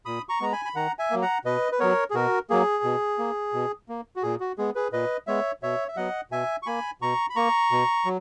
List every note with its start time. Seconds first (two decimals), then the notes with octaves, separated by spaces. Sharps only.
0.06 A#2 B5 D#6
0.29 A#5 C#6
0.40 G#3 B3 A#5
0.52 G#5 B5
0.65 B5
0.75 D#3 F#5 A#5
0.99 E5 G#5
1.11 F#3 A#3
1.22 F#5 A#5
1.45 B2 B4 D#5
1.72 B4
1.79 F#3 B3 A#4 C#5
2.10 G#4
2.14 B2 F#4 A#4
2.50 F#3 A#3 G#4
2.84 B2
3.19 A#3
3.53 B2
3.89 A#3
4.16 F#4
4.23 A#2 G#4
4.40 F#4
4.58 G#3 B3 G#4
4.75 G#4 B4
4.93 A#2 B4 D#5
5.27 G#3 B3 C#5 E5
5.63 B2 C#5 E5
5.88 E5
5.97 F#3 B3 D#5 F#5
6.31 B2 E5 G#5
6.62 C#6
6.66 A#3 G#5 B5
7.01 B2 A#5 C#6
7.30 B5
7.36 A#3 A#5 C#6
7.71 B2
8.05 F#3